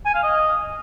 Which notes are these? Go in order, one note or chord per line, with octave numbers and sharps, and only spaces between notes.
G#5
F5
D#5